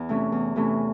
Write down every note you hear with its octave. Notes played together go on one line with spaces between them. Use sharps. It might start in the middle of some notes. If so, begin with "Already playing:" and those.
Already playing: E2
C3 E3 A3 C#4
E2
C3 E3 A3 C#4